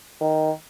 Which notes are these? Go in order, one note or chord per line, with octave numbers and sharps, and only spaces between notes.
D#3